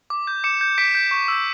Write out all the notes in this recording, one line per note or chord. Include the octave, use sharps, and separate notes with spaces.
D6
G6
D6 C#7 E7
G6
D6 B6 D7
G6
C#6
E6 G6